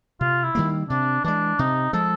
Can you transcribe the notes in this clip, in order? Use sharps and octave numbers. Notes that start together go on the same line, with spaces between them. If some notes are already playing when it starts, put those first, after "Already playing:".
C3 F4
E4
D#3 G3 A#3
C3 D4
E3 G#3 D4
C3 D#4
F3 G#3 A4